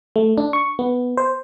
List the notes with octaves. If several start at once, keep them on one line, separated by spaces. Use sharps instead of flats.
A3
D4
C#6
B3
C5